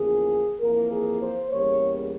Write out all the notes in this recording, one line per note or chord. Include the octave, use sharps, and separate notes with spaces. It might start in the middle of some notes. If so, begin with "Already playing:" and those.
Already playing: E2 C#3 F3 A#3 G#4
F2 E3 A#3 A#4
G#4
C5
E2 C#3 G3 A#3 C#5